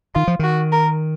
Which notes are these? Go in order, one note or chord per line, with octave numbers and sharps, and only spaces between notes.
D#3 F4
F3
D#3 F#4
A#4